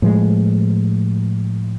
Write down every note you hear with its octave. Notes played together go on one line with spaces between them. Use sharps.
A2 F3 G#3